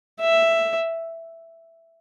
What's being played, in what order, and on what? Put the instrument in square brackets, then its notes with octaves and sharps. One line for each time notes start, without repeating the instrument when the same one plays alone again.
[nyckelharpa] E5